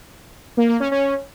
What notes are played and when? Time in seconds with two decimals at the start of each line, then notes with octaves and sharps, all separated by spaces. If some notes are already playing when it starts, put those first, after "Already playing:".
0.57 A#3
0.69 A#3
0.80 C#4
0.92 C#4